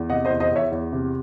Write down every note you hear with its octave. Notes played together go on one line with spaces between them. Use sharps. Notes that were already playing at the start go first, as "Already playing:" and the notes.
Already playing: E2
C3 D#5 F#5
C5 D#5
E2
C5 D#5
E2 C#5 E5
E2
C3